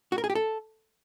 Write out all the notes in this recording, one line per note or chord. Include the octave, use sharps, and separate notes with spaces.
F#4
A#4
G#4
G4
A4